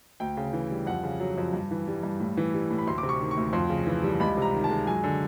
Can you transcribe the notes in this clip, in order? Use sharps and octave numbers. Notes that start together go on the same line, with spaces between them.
D2 G5
C#3
E3
G3
F2 F#5
C#3
F#3
F2
G2
E3
G3
G2
A2
E3
G3
A2
B5
D2 C6
D6
C3
C#6
D#3
C#6
D2
F2 C6
C#3
E3
G3
C#2 B5
C3 A#5
D#3
A5
G#3
F#2 G#5
D3